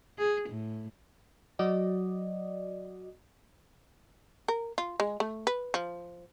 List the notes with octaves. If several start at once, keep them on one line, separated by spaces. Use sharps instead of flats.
G#4
A2
F#3 F#4 D5 D#5
A#4
F4
G#3
A3
B4
F3